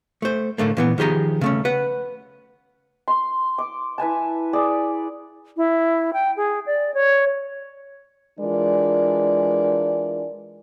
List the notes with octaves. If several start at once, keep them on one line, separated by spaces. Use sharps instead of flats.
A3 C5
A2 D3 A3 A#3
A#2 E3 B3
D#3 F3 G4 G#4 A#5
C#3 A3 C#4
B4 F#5
C6
D6
E4 B4 G#5 A5
G#4 D5
E4
G5
G#4
D5
C#5
E3 G#3 D4 F4 A#4 D5